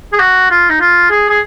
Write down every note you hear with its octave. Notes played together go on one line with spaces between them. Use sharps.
G#4
F#4
F4
D#4
F4
G#4
G#4